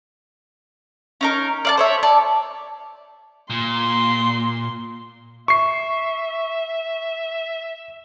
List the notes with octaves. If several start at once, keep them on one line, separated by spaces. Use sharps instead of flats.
C#4 D#4 A#4
D5 F5 A5
C5 C#5 E5
D5 A5
A#2 C6
E5 C#6 C7